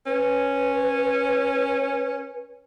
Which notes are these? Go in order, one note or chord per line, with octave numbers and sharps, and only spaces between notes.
C#4 B4